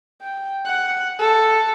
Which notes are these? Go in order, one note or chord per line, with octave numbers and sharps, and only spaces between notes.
G5
F#5
A4